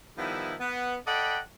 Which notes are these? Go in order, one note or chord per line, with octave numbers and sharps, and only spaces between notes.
D#3 F3 G3 B3 E4
B3
A4 D5 D#5 F#5 G5 B5